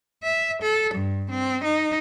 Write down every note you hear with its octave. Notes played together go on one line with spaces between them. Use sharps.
E5
A4
G2
C4
D#4